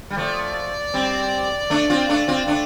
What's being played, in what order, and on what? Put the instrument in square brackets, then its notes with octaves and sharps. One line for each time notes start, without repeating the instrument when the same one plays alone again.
[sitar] G3
[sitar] F3 A3 [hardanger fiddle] D5
[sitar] G3 C4
A3 D4
C4 F4
A3 D4
C4 F4
A3 D4